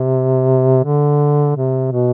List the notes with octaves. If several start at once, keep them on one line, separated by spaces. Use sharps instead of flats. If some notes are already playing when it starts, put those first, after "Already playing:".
Already playing: C3
D3
C3
B2